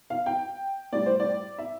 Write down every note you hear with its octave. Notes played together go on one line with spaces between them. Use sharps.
F5
G5
A2 G3 D5
C5
D5
E5